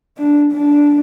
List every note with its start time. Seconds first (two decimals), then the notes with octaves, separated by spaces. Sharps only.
0.17 D4
0.52 D4